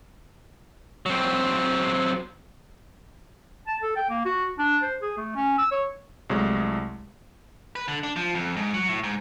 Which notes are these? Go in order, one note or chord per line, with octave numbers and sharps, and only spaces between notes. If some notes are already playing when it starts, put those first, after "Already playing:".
F#3 C4
A5
A4
G5
A#3
F#4
D4
C5
G#4
A3
C#4
E6
C#5
C2 F#3 G#3 A3
B4
D3
D4
F3
F2
G#2
F#3
A2
G#2